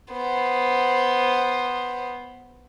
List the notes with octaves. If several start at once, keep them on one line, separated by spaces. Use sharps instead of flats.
B3 C5